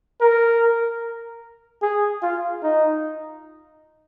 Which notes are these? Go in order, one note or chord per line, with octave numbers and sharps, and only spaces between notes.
A#4
G#4
F4
D#4